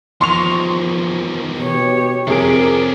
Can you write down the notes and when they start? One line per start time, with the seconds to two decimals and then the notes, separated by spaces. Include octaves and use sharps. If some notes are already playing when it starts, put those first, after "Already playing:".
0.21 E2 D#3 F3 C6 C#6 F7
1.60 B2 G4 C#5
2.27 F2 C3 C#4 D4 G#4 A#4 D7